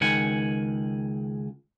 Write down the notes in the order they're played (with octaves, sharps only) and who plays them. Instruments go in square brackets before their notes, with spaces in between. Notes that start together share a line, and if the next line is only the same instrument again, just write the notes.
[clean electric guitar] C#2 D#3 F#5 G#5